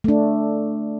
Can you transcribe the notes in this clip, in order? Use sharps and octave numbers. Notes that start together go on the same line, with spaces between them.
A3 D4